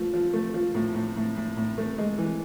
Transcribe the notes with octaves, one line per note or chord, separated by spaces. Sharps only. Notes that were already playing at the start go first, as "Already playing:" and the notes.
Already playing: F3 A3
F3
A3
F3
A2
A2
A2
A2
A2
A3
G#3
E3